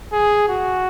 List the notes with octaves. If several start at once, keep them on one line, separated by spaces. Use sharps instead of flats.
G#4
F#4